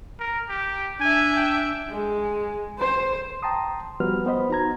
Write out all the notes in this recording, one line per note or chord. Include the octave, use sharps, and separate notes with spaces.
A#4
G4
D4 E5 G#5
G5
G#3
C5
G5 A5 A#5 C6 D#6
F3 G3 B3 F#4 B4 F6
B3 C5 D#5 B5
D#4 F#4 A#5 G#6